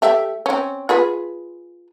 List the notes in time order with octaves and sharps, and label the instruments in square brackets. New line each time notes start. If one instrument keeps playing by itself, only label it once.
[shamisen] A3 G4 E5
C4 C#4
F4 G#4 B4